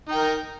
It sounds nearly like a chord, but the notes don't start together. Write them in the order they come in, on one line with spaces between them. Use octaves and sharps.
D#4 G5 A#4